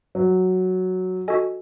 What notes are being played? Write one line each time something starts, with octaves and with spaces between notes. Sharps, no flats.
F#3
F#4 A4 D#5 G#5